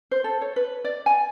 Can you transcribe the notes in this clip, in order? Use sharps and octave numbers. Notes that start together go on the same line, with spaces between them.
C5
A4
C#5
B4
D5
G#5